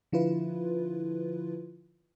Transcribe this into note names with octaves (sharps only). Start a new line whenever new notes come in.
D3 F3 E4 F4 B4